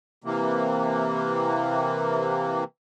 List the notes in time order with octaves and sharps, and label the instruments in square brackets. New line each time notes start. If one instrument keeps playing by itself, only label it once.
[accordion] C3 E3 A#3